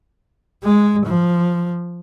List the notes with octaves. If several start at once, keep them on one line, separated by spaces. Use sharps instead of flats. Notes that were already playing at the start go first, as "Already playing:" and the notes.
G#3
F3